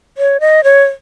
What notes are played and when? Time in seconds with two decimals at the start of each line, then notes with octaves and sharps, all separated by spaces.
0.18 C#5
0.40 D#5
0.64 C#5